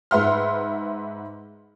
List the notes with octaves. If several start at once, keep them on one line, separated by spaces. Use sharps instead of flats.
G#2 B4 E5 F#5 C6 F6